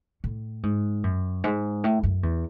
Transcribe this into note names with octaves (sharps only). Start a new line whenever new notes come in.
A2
G#2
F#2
G#2
A2
F#2
E2